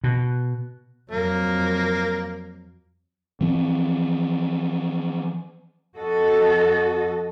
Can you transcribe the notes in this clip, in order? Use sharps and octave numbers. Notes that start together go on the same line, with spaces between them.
B2
F2 F#3 A#3
E3 F3 C4
F2 F#4 A4 D#5